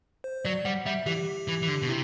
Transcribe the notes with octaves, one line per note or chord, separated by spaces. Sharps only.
C5
F#3 D5
G3 F#5
G3 E5
E3 G4
E3
E3
D3
B2
C3 E4